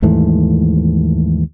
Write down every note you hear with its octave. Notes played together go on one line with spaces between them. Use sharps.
D#2 G#2 E3 A3